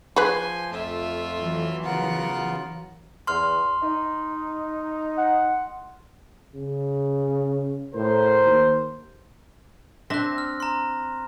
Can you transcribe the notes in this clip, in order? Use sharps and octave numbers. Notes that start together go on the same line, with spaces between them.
F3 G#4 B4 G#5 C6
F2 A3 F4 E5
E3 F#3
C#3 B3 F4 A#4 F#5
E2 C6 F6
D#4
F#5
C#3
A2 A#4 C5
D#2
C4 D4 E5 F#6 A#6
F6
A#5 C6